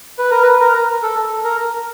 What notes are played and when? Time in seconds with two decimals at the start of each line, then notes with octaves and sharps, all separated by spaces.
0.18 B4
0.31 A#4
0.43 B4
0.61 A#4
1.03 A4
1.44 A#4